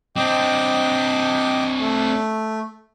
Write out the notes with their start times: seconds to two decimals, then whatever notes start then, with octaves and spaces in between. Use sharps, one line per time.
0.16 C4 D4 D#5 G5 D6
1.79 A3